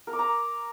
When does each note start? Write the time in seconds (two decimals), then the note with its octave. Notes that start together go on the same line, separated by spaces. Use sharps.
0.07 A#4
0.13 D6
0.19 A#5